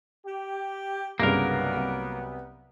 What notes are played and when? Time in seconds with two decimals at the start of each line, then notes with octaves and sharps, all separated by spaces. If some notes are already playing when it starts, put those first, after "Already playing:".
0.25 G4
1.20 C2 G2 C#3 F#3 A#3 B3 A#4
1.76 C2